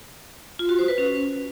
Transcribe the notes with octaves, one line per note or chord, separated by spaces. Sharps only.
F4
F#4
C5
B4
C#4